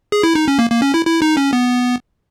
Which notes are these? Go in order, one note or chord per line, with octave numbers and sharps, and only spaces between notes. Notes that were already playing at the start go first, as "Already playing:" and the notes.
G#4
E4
D#4
C#4
A#3
A#3
C#4
E4
E4
D#4
C#4
B3